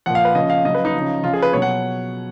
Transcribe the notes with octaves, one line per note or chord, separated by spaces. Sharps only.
A#2 F3 F#5
F5
B4
C#3 F3 D#5
F5
C#3 F#3 D#5
B4
D#4
C#3 F3
C#3 F3 F4
G#4
B4
B2 F#3 C#5
F#5